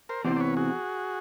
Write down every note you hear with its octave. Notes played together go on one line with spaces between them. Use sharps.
A#4 C5
E2 C3 E3 C5 D5
D5
B4 C#5
F#4 G#4